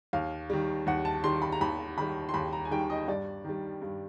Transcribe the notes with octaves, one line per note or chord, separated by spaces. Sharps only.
D#2 F5
D#3 G3
D#2 F#5
A5
D#3 G3 C6
B5
A#5
D#2 B5
D#3 G3 B5
C6
D#2 B5
A#5
G#5
D#3 G3 G5
D#5
G2 D5
D#3 G3
G2